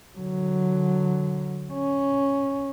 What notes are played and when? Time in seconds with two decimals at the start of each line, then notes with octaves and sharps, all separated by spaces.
0.17 D3 F#3
1.73 C#4